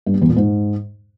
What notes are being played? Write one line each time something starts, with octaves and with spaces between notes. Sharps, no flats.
G2
G3
E2
A#2
G#2